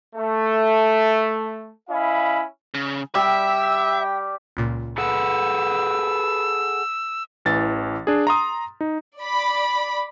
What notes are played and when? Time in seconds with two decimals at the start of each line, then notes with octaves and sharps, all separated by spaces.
0.16 A3
1.89 C#4 E4 D#5 F5 B5
2.74 C#3
3.15 G3 G4 E5 G5 E6
4.57 C#2 A#2
4.98 G#4 A4 B4 F#5 E6
7.45 A1 E3 A6
8.07 D4 G#4
8.27 A#5 C6 D#6
8.81 D#4
9.22 D5 B5